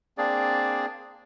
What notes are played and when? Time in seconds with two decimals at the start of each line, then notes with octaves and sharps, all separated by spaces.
0.18 A#3 C4 D4 G#4 D5